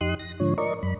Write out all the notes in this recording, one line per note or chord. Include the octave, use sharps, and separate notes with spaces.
F2 D#4 G4 C6 D#6 F#6
A#6
G#2 D3 F3 C#5
A#4 D5 D#5 C#6
F#2 B5